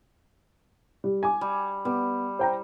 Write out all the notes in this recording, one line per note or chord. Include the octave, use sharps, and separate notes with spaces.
G3
G#5 D6
G3
G3 B3
C5 G5 A#5